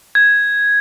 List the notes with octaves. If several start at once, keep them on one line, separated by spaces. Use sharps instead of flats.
G#6